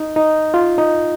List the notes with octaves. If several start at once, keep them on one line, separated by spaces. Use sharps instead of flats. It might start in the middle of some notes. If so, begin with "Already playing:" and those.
Already playing: D#4
D#4
F4
D#4